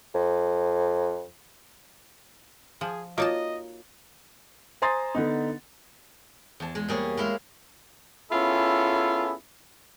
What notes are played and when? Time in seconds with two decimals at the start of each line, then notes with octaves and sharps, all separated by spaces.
0.15 F2
2.81 F3 G#4
3.18 A#3 D#4 F4 F#4 C#5 D#5 A5
4.82 C5 G#5 A#5 C6 D#6 A6
5.15 D3 B3 D#4
6.60 E2 A5
6.75 G#3
6.88 G3 A#3 G#4 C#5
7.17 G#3 E4 F5 C6
8.31 B3 C#4 E4 F4 G#4 A4